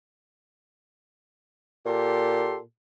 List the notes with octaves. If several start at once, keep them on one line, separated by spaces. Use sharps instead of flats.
A#2 G4 A4 C6